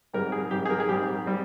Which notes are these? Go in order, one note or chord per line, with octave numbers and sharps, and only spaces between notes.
G#2 G3 C4 A#4
G#4
G#2 G3 C4 G4
G#4
A#4
G#4
G#2 G3 C4 G4
G3 C4